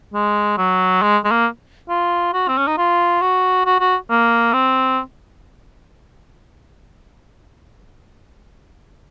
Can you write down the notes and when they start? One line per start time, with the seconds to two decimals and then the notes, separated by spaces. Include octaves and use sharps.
0.14 G#3
0.58 F#3
1.02 G#3
1.25 G#3
1.31 A#3
1.90 F4
2.33 F#4
2.48 C4
2.58 C#4
2.68 D#4
2.78 F4
3.22 F#4
3.66 F#4
3.80 F#4
4.10 A#3
4.53 C4